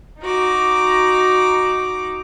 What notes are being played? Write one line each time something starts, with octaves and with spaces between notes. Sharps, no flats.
D#4 F#4 A#5 D6